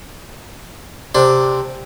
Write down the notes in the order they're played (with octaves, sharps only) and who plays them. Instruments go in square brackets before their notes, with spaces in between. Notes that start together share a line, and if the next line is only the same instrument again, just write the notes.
[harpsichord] C3 D4